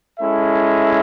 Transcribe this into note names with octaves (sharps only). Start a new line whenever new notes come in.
G#3 C#4 E4 A4 E5